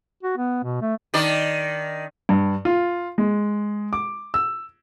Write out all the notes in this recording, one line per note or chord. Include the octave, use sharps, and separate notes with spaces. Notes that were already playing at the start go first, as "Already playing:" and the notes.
F#4
B3
B2
A3
D#3 D4 D5
G2
F4
G#3
D6
E6